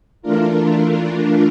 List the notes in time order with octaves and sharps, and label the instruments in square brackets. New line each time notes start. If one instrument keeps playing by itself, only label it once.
[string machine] E3 A3 D4 F4 A#4